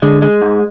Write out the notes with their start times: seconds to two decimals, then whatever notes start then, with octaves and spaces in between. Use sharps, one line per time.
0.02 D3 G#3
0.22 G#3
0.42 G#2